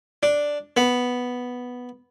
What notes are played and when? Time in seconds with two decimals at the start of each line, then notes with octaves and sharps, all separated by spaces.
0.23 D4
0.77 B3